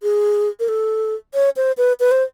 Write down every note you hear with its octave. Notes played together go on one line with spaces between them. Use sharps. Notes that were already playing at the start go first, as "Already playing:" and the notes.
G#4
A#4
A4
C#5
C5
B4
B4
C5